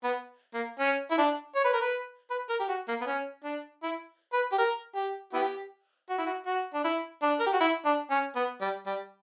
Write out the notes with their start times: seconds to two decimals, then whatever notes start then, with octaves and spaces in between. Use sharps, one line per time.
0.04 B3
0.54 A#3
0.79 C#4
1.11 E4
1.18 D4
1.55 C#5
1.64 B4
1.73 A#4
1.81 B4
2.31 B4
2.49 A#4
2.60 G4
2.69 F#4
2.88 A#3
3.01 B3
3.06 C#4
3.44 D4
3.83 E4
4.33 B4
4.52 G4
4.58 A#4
4.96 G4
5.33 B3 E4 G4
6.10 F#4
6.18 E4
6.26 F#4
6.46 F#4
6.74 D4
6.85 E4
7.22 D4
7.40 A#4
7.46 G4
7.53 F#4
7.60 E4
7.85 D4
8.10 C#4
8.36 B3
8.61 G3
8.86 G3